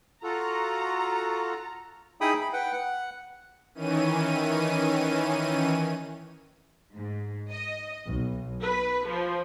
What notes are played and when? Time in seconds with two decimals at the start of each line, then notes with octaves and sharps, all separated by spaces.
0.24 F4 F#4 A4 A#5
2.21 D#4 E4 G#4 G5 B5 D#6
2.41 B5
2.53 B4 F#5 G5
2.73 F#5
3.75 D#3 E3 C#4 D#7
6.93 G#2
7.51 D#5
8.07 B1
8.62 B4
9.07 F3